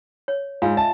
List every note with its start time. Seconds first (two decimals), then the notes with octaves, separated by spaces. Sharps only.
0.28 C#5
0.62 G#2 F4 F5 G#5
0.77 D#5 E5 A5